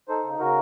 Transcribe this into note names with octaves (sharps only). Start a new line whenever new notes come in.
D#4 A4 C5
C#3
C#3 F#4 A#4